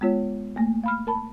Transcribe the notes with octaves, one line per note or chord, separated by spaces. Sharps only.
G#3 B3 F4 C#5
A3 A#3
F5 B5 F6
A#4 A5 B5